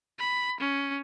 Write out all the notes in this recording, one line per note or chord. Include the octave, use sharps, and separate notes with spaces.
B5
C#4